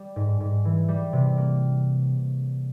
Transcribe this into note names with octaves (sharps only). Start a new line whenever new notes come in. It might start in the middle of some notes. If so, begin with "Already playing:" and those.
Already playing: G3
G#2
G#2
E3
G3
C3
A#3